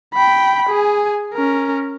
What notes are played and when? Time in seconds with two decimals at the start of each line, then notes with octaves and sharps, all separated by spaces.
0.14 G5 B5
0.69 G#4 G#5
1.33 C#4 A#4